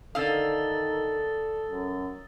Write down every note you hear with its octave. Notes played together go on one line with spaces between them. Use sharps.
D3 D#3 A4 F5 D#6 E6 A6
F#2